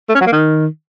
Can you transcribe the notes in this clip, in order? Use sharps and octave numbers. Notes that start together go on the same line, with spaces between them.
A3
C#4
F#3
A#3
D#3